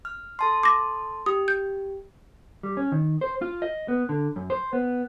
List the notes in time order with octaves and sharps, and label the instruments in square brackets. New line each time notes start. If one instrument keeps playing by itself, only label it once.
[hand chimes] F6
A4 A5 C6
[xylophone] D6 A#6
[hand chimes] G4 [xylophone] D#6
[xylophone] G6
[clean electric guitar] G3
C#4
D#3
C5
F4
D#5
B3
D3
F#2
C5
B3